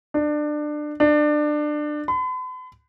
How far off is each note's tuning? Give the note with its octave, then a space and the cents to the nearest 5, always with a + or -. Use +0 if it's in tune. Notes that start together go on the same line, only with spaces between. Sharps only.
D4 +25
D4 +25
B5 +45